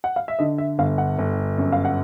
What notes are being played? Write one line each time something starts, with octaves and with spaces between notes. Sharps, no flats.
F#5
F5
E5
D3 D#5
E5
G1 F5
F#5
G1
F#2
F5
F#5